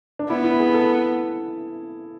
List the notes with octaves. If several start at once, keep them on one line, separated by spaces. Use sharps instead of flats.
D4
B3 E4
E4
G#4
A4